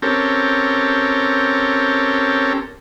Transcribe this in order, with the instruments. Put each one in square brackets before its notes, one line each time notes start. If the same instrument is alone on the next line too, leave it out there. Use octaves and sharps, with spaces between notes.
[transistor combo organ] C4 C#4 G4 A4 A#4